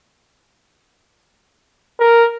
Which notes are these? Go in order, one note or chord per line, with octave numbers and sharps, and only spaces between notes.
A#4